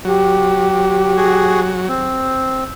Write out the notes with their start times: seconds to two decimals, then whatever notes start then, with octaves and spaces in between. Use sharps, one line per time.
0.05 F#3 G4
1.17 F#4 G#4
1.88 C4